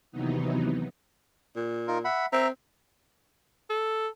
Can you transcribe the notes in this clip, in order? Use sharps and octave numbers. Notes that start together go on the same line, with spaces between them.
D#2 C3 E3 F#3 B3 D#4
A#2
D#4 F4 A#4
E5 F#5 B5
C4 E5 A#5
A4